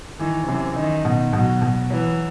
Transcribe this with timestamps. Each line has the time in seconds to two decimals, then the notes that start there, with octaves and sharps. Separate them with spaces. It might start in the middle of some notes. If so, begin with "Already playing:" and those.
0.19 D#3 E3
0.48 F#2 C3
0.76 D#3 D#4
1.05 B2
1.33 B2 F#3
1.62 B2
1.90 E3 F#3